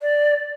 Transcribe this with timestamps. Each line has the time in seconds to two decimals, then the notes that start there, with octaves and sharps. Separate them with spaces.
0.01 D5